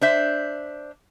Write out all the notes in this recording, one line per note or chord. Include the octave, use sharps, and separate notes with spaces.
D4 C5 E5